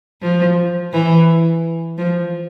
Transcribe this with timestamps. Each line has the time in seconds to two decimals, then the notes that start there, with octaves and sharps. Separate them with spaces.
0.22 F3
0.93 E3
1.98 F3